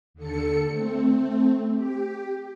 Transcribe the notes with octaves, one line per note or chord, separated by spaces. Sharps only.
D#2 D3 A4 C#7
A3 C4
G4